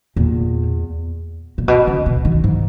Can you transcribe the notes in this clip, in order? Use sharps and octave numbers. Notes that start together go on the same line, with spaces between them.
E2 A#2
A#2
B2
C#3
B2
D#3
G#2 E3